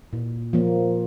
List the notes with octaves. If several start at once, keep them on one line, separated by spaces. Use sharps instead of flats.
A#2
F3 A#3